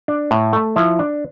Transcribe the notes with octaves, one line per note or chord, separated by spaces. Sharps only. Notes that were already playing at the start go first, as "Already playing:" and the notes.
D4
A2
A3
F3 E4 E5
D4